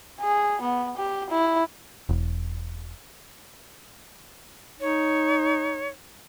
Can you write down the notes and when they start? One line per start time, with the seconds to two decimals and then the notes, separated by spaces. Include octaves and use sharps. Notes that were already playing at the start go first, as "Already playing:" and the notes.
0.21 G#4
0.61 B3
0.97 G4
1.30 E4
2.09 E1
4.80 D#4 C#5